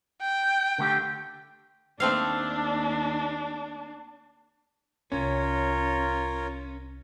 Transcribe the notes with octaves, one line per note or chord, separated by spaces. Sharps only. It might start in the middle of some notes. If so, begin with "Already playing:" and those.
G5
D3 A3 G4
D#2 A3 C4 D4 F5
C2 C#4 F4 A#4 C#5